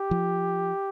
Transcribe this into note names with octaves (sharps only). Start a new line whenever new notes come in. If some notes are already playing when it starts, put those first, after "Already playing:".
Already playing: G4
F3